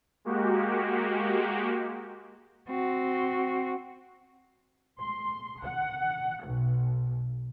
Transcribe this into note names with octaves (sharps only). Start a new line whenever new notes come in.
G#3 A#3 F#4 G4
C4 F#4
C6
F#5
B1